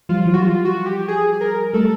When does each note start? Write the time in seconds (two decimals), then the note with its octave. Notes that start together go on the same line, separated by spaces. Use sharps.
0.09 F3 G3 F4
0.25 E3 F#3
0.34 F#4
0.42 F3 G3 F4
0.65 F#4
0.86 G4
1.08 G#4
1.41 A#4
1.73 G3 A3 A4